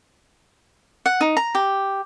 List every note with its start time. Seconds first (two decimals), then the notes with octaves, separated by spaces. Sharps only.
1.06 F#5
1.21 D#4
1.37 A#5
1.55 G4